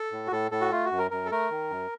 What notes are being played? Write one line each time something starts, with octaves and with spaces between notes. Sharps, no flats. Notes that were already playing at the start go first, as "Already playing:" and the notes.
Already playing: A4
A2
F#4
A2 A4
A2 A4
F#4
A3 F4
F#4
F#2
A#4
F#2 A#4
A4
A3 A#4
D#3
F#2